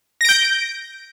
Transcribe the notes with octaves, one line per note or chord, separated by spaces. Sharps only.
G6 A#6 D7